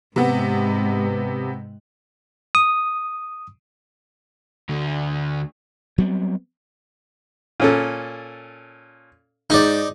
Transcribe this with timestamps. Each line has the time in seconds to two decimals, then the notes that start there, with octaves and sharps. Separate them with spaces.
0.16 G#2 C3 B3
2.55 D#6
4.69 D2 D3
5.98 F#3 G3 B3 C4
7.60 A#2 C#4 A4
9.50 G#2 D#4 D5